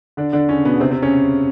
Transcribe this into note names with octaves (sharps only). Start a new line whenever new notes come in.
D3 D4
D3 D4
C#3 C#4
B2 B3
C3 C4
C3 C4
C#3 C#4